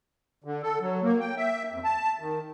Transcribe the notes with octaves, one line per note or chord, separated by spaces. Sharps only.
D3
A4
F#3
A#3
G5
E5
F2
A5
D#3